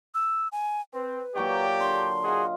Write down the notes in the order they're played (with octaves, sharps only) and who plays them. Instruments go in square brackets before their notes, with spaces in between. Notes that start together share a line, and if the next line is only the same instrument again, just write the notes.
[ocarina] E6
G#5
[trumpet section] C4 [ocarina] B4
[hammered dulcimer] A#2 F#3 C#6 [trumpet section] G4 D5 G5
[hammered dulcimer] D3 [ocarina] C6
[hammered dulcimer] F4 D#5 [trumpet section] F#4 G#4